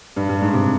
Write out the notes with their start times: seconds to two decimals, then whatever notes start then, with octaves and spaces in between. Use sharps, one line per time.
0.16 G2
0.29 G2
0.42 G#2
0.53 C3